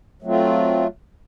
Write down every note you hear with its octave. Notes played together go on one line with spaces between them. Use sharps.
F#3 A3 C4 F4